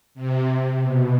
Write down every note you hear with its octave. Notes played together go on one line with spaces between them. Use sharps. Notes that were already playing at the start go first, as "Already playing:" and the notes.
C3
B2